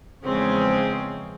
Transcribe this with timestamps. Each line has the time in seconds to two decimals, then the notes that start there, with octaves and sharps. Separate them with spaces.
0.24 E2 C#3 F3 G#3 C4 C#4